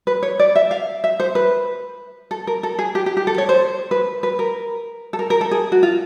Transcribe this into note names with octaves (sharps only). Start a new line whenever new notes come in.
B4
C#5
D5
E5
F5
E5
C5
B4
A4
A#4
A4
G#4
G4
G4
G4
A4
C#5
C5
B4
B4
A#4
A4
A#4
A#4
A4
G#4
F#4
F4